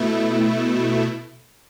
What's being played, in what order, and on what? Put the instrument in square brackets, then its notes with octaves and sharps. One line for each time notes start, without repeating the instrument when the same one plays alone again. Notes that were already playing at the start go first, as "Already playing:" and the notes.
Already playing: [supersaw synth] B2 A3 E4